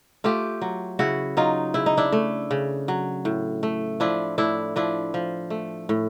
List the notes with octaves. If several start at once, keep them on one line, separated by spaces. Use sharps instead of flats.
A3 F4 G4
F#3
C#3 E4 F#4
F#3 D#4 F4
C#3 E4
D#4
D4 E4
A3
C#3
F#3
A2
A3
F3 D4 E4
A2 D4 E4
F3 D4 E4
F3
A3
A2